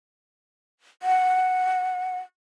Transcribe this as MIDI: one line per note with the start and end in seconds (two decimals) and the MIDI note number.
1.03 2.19 78